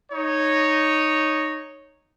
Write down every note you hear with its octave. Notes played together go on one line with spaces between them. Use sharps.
D#4 C#5